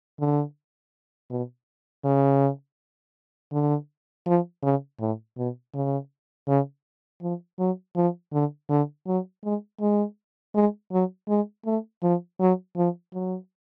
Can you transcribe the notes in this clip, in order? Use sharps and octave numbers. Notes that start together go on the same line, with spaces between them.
D3
B2
C#3
D3
F3
C#3
A2
B2
C#3
C#3
F3
F#3
F3
D3
D3
F#3
G#3
G#3
G#3
F#3
G#3
A3
F3
F#3
F3
F#3